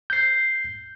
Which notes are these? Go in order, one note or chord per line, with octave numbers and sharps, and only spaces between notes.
G6 C7